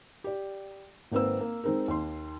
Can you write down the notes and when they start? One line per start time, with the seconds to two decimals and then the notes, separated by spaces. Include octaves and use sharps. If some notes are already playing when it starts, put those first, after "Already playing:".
0.24 G4 D5
1.12 G#1 A#3 C4 B4 E6
1.40 A#3
1.64 G#3 C4 D#4 G#4 A#4
1.88 D#2 C6